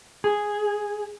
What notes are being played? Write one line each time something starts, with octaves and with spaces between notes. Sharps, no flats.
G#4